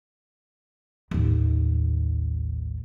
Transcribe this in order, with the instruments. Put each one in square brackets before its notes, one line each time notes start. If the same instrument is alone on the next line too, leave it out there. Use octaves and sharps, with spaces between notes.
[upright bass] A1 D#2